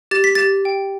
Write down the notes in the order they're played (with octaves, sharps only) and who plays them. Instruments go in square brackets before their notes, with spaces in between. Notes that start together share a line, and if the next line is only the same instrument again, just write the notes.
[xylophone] G4 A6
B6
G4 A6
G5